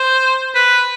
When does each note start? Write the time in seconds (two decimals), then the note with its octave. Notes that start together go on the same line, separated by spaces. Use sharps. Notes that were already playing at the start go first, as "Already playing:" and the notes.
Already playing: C5
0.55 B4